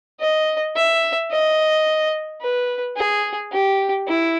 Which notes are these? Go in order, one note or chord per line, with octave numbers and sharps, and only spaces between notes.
D#5
E5
D#5
B4
G#4
G4
E4